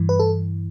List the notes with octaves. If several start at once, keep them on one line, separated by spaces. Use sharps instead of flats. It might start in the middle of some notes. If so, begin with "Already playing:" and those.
Already playing: G2 E3
B4
A4